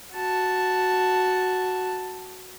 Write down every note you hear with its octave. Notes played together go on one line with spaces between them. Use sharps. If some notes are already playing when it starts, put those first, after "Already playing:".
F#4 A5